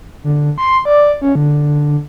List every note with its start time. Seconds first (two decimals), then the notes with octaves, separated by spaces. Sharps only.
0.24 D3
0.58 C6
0.85 D5
1.22 C#4
1.35 D3